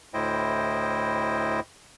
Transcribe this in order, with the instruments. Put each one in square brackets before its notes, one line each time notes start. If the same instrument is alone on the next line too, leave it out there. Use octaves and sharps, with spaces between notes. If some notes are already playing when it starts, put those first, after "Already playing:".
[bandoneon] D2 A2 E4 C5 D#5 G5